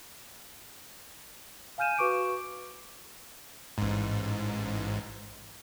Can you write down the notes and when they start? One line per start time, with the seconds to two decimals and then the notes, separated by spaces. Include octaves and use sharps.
1.78 F5 G#5 F6 G6 D#7 E7
1.98 F#4 B4 C#6 D6 D7
3.78 A1 G#2